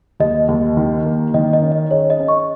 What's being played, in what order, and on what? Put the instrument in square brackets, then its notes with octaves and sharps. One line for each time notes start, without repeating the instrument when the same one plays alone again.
[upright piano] D#2 [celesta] D#5
[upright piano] D#2
D#3
A#3
[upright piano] D#3 [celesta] D#5
[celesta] D#5
[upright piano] C#4
[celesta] D#5
[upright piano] G#4 [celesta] C#5
[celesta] D#5
[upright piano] C#4
[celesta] C#6